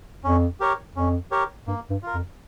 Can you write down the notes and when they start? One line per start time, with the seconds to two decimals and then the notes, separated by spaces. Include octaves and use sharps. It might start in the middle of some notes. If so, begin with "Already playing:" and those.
0.24 F2 C#4
0.60 G4 A#4 C#5
0.95 F2 C#4
1.31 G4 A#4 C#5
1.67 G2 A#3
1.90 G2
2.03 F4 A#4
2.14 F2